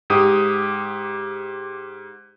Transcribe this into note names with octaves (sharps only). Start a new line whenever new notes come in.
G#2 G4 D#6